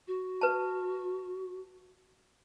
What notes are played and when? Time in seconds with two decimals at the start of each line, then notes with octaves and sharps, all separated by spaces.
0.08 F#4
0.41 B4 A5